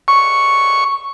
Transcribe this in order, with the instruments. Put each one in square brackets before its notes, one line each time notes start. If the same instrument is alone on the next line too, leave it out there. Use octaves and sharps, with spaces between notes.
[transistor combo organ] C#6